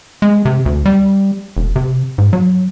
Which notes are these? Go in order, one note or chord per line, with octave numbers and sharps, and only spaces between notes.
G#3
C3
D2
G3
E1
C3
G#2
F#3